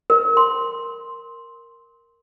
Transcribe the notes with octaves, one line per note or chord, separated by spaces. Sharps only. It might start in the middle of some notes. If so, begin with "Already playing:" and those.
A#4
C6